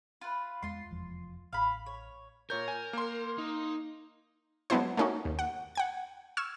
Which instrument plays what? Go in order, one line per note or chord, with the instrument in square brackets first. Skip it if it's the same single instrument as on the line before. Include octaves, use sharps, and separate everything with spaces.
[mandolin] F4 B4
[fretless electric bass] E2 G#3 [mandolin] F4 C6
[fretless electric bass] F1 E2 F3
[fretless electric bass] A1 [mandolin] F5 B5
[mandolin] C#5
[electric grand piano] A#2 C#5 G6 [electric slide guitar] A#4
[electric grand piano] G#5
A#3 C6
[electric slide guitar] D#4
[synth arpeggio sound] F#3 G#3 B3 D4 E4 C5
A3 A#3 C#4 D#4 F#4
D#2
F#5
F#5 G5 G#6
C#6 E6 F6 G#6 E7